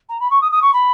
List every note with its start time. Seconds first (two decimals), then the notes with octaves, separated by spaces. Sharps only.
0.09 A#5
0.20 B5
0.30 C#6
0.41 D#6
0.52 D#6
0.62 C#6
0.73 B5